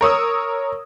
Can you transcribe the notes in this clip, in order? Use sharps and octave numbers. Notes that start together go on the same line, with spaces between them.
A#4 C#5 D#6 E6